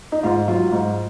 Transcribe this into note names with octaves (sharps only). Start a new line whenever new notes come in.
D#4
G#2 F4
F#3 F4
G#2